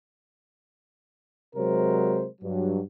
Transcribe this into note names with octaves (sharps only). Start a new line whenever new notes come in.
C3 F#3 G#3 A#4 C5
G2 F#3